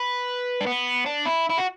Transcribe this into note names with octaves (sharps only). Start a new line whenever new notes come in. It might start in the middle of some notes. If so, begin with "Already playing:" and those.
Already playing: B4
D4
B3
D4
E4
E4
F#4